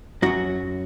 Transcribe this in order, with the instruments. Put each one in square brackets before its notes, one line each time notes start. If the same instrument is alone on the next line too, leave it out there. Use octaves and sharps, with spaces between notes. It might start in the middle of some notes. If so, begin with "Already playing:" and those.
[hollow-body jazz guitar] F#2 F#3 F#4